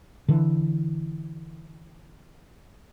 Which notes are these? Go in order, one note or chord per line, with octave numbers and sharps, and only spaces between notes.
D3 E3